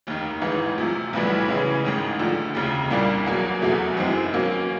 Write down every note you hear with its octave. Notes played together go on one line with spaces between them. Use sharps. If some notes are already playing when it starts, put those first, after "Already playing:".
F1 D#2 D#3
A1 G#2 E3
D2 C3 F3
B1 A2 E3 G3
C#3 E3 G#3 C#4
A1 G#2 D#3
D2 D3 F3
F1 D#2 C#3
C2 A#2 G3 A#3 D4
E2 B2 F#3 A#3
F1 E2 B2 F#3 A3
F#2 D#3 G#3 C4 E4
B2 F#3 A#3 C#4